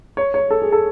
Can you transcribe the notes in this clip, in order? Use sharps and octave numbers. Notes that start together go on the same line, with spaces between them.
C#5
C#5
A4
G#4
A4